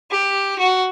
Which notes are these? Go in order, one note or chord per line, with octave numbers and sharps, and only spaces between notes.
G4
F#4